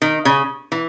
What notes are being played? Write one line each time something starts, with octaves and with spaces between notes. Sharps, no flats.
D#3
C#3
E3